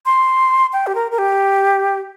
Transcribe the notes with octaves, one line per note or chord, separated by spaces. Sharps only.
C6
G5
G4
A#4
A#4
G4